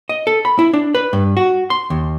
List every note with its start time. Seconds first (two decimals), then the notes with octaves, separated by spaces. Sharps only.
0.09 D#5
0.27 A4
0.45 B5
0.59 E4
0.73 D4
0.95 B4
1.13 G2
1.37 F#4
1.70 C6
1.90 D#2